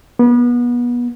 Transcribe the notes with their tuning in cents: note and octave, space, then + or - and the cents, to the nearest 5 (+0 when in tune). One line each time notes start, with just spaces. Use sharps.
B3 -30